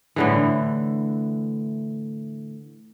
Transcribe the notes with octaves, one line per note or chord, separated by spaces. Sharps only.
A2 D3 E3